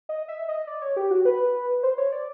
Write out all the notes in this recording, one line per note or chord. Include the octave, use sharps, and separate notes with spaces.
D#5
E5
D#5
D5
C#5
G4
F#4
B4
C5
C#5
D5